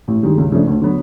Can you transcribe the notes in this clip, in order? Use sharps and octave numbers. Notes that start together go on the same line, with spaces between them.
A1
G2 D#3 G#3
C#2
C#3 F3 A3 D4
D2
D3 F#3 B3